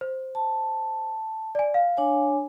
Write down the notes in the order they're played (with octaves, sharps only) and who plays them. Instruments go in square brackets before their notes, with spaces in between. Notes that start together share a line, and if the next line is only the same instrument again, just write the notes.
[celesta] C5
[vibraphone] A5
[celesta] D5 G#5
F5
[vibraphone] D4 C#5 G#5